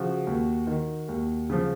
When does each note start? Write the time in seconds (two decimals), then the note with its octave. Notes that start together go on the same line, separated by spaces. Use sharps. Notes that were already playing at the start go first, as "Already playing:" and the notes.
Already playing: C#3 F3 F#4
0.27 D#2
0.67 D#3
1.09 D#2
1.50 C#3 F3